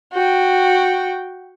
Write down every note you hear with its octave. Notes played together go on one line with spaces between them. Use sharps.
F#4 G5